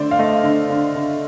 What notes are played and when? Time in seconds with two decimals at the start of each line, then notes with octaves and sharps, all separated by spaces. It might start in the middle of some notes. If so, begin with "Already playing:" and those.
Already playing: D3 A3 C5 D5
0.11 F5
0.19 A3 D#5
0.43 D3
0.70 D3
0.95 D3